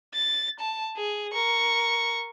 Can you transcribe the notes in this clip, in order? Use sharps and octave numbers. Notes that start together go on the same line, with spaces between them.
A6
A5
G#4
A#4 C#6